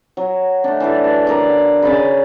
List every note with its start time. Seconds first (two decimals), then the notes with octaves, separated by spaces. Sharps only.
0.17 F#3
0.64 A3 D4
0.80 E3 D4 A4
1.04 B4
1.27 D3 A#4 D5
1.82 C#3 D5 D#5 B5